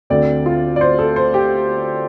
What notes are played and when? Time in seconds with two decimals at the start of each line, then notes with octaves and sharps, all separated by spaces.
0.10 D2 D3 A3 C4 D5
0.46 F4
0.76 D5
0.81 C5
0.99 A4
1.16 C5
1.34 G4